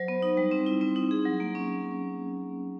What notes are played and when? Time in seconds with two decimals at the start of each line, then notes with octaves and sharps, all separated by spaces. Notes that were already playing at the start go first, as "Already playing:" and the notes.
Already playing: F#3 C5
0.08 B3
0.22 D#4
0.37 G3
0.51 C4
0.66 E4
0.81 C4
0.96 D#4
1.11 G#4
1.25 F#3
1.40 A#3
1.55 C#4